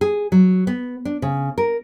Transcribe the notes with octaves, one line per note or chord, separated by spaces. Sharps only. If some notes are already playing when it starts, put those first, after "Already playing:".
G#4
F#3
B3
D4
C#3
A#4